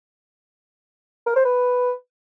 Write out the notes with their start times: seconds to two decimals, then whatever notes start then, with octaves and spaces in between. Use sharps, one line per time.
1.26 A#4
1.36 C5
1.45 B4